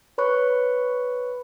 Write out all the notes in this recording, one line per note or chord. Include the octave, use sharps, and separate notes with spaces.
B4 C#5 B5 C#6 F#6